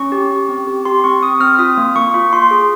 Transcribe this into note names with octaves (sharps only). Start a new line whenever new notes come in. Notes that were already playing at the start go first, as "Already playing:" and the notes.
Already playing: C#4 C#6
G4
G4
C4
G4
G4 C6
C4 C#6
C4 D#6
C4 F6
F4 D#6
A#3
A#3 C#6
F4
F4 C6
G#4